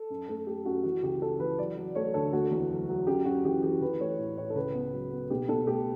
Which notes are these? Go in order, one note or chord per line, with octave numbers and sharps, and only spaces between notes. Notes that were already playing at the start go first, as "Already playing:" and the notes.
Already playing: A4
F#2
A3
A3 G4
F#2 F#4
E3 F#4
C#2 G4
C#3 A4
E3 B4
F#3 D5
F#3
A3 C#5
D2 A4
A3 F#4
E2
F#3
F#3
F#2 G4
F#2 F#4
E3 G4
E3 G4
E3 B4
A3 C#5
A2
A2 C#5
A4
C#2 B4
B3
F#3
B3
B2 G4
B2 A4
A3 G4